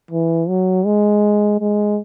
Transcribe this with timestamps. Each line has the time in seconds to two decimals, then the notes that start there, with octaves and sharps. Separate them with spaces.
0.11 E3
0.49 F#3
0.86 G#3
1.60 G#3